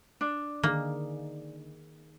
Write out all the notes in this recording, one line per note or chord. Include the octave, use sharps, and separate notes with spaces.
D4
D3 D#3 A#3 D#4 G#4